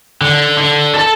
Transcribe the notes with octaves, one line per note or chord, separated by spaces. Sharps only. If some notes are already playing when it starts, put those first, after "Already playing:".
D3
D3
A4 A5